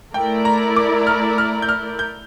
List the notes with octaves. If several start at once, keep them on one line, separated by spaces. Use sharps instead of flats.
A3 E4 A#4 D5 G5
A#5
D6
F6
F6
G6
F6
G6